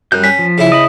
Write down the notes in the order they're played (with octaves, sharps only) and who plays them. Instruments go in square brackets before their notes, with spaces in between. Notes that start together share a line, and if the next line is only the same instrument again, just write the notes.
[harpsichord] F#2 [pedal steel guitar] G3 F#6 G6
[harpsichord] C#4 [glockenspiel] B6
[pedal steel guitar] F3
[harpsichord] C#3 E4
[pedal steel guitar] D#5 B5 [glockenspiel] D#6